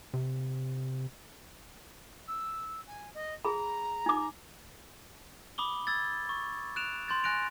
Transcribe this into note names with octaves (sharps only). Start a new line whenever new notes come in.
C3
E6
G#5
D#5
G#4 A#5 B5
D#4 D6
B5 D6 D#6 G7
E6 G#6 A6
C#6
F#6 D7 E7 F7
C6 G6 A6
G#5 F#6 A#6 D7 F7